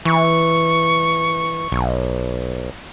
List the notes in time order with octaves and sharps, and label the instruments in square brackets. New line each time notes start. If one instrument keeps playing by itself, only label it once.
[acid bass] E3 [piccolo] C#6
[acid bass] B1